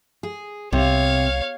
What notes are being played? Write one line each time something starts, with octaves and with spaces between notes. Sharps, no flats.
G#4
C2 C3 C#5 F5